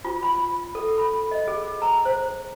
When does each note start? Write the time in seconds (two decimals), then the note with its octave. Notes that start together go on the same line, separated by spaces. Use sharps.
0.05 F4
0.23 B5
0.75 A4
0.98 B5
1.31 D#5
1.48 G#4
1.82 A#5
2.05 C5